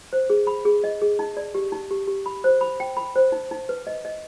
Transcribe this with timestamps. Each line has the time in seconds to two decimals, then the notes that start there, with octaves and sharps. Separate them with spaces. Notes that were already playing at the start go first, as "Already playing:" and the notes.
0.13 C5
0.30 G#4
0.47 B5
0.65 G#4
0.84 D#5
1.02 G#4
1.19 D#4
1.37 D5
1.55 G4
1.72 D#4
1.91 G4
2.08 G4
2.26 B5
2.44 C5
2.61 B5
2.80 G5
2.97 B5
3.16 C5
3.32 D#4
3.51 D#4
3.69 B4
3.87 D#5
4.05 D#5